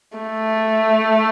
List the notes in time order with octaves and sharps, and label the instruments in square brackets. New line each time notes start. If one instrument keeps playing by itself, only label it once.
[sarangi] A3